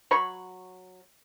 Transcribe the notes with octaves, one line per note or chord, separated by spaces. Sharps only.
F#3 C#5 B5 C#6